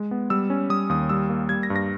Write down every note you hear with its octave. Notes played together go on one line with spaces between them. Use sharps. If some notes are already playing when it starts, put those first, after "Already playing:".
Already playing: G#3
B3
G3 E6
C#4
G3 D#6
D#2 D#6
G3 E6
A#3
G3 G#6
A#6
G2
A#6